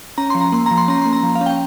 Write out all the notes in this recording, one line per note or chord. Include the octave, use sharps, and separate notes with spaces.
C#4 A#5
F3 C6
A#5
A#3 C6
F3 A#5
C6
C#4 A#5
A#3 C6
A#5
F3
F5
C#4
G5